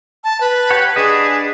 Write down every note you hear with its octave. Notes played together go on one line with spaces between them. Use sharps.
A5
B4
G4 C#5 F#5
D4 G#4 B4 D#5